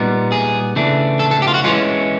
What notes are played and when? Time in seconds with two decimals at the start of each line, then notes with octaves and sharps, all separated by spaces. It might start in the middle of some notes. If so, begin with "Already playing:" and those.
Already playing: A#2 G3 B3 D#4
0.32 G#4
0.76 C#3 E3 A3 D4
1.19 A4
1.31 A4
1.42 G4
1.48 F4
1.54 F#4
1.64 E3 G#3 C#4 F4